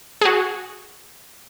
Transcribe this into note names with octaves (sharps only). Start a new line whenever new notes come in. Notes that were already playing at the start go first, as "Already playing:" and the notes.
F#4 G#4